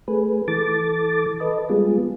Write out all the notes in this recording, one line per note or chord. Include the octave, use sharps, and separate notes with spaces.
A3 G#4 B4
E3 A4 D6 A6
A4 B4 D#5
G3 G#3 B3 F4 G#4